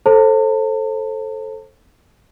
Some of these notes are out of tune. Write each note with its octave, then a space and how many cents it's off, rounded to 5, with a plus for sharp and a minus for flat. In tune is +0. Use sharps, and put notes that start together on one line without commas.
A4 +0 C5 +25 A5 +40